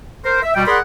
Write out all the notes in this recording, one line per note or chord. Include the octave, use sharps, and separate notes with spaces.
A#4 C5
E5
B2 G3 G5
G#4 A#4 D5 F#5 B5 C6